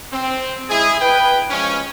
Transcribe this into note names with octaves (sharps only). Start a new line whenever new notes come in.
C4
G#3 E4 G#4
B4 G5
F3 G#3 C#4